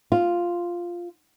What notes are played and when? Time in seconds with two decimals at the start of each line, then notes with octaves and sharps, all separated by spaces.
0.12 F4